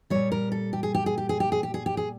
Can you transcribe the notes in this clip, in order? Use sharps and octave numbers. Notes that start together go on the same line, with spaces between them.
A#2 G3 C#5
A#4
A4
G4
G#4
G4
G#4
G4
G#4
G4
G#4
G4
G#4
G4
G#4